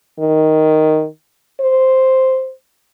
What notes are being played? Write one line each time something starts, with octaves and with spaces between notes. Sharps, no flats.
D#3
C5